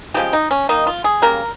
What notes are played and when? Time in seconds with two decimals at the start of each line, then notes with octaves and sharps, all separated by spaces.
0.14 C#3 F3 G#3 G4
0.33 D#4
0.51 C#4
0.69 D#3 A#3 D#4
0.87 F4
1.04 G#4
1.22 C#3 G3 A#3 A#4